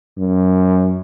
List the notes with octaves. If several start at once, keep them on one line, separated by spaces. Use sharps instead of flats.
F#2